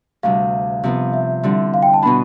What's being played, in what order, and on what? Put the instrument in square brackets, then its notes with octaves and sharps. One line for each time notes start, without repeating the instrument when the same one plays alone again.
[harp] D2 C3 G3 [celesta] F5
[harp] C3 F3 B3
[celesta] E5
[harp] D3 G3 C4 E4
[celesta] F5
G5
A5
[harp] B2 B3 D4 [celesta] B5